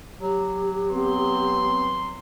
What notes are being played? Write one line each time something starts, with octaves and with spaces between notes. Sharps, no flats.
F#3 G4
B3 C4 C6